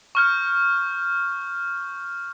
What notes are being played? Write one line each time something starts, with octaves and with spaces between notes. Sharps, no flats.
C#6 F6 G6